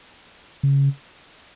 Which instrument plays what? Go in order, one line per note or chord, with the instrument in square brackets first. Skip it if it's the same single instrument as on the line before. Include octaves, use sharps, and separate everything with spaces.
[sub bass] C#3